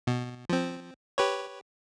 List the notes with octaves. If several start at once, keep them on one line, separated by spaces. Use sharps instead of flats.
B2
F3 C4
G4 B4 C#5